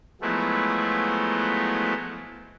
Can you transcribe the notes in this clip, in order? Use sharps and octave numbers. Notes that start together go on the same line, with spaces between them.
F3 F#3 G#3 A3 B3 E4